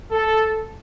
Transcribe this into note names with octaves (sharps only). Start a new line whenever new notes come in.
A4